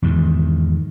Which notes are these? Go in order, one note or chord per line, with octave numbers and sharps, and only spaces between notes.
E2 G#2 D#3